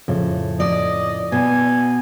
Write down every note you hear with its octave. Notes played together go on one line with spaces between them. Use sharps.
F2 A2 C#3
D5 D#5
B2 G#5